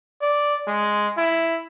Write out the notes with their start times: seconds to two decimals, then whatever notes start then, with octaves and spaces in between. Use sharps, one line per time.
0.21 D5
0.67 G#3
1.17 E4